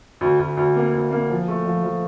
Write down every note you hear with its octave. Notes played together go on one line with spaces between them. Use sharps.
D2
D2
D2
A#3
D2
A#3
F3
A3
F3
F3